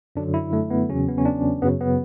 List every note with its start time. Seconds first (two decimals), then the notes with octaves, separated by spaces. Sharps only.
0.16 F#2 D3 F#3 D4
0.34 E4
0.53 A3
0.70 B3
0.89 E2 C#3 F#3 C#4
1.09 B3
1.18 C#4
1.25 D4
1.62 F#2 C#3 F#3 B3
1.81 B3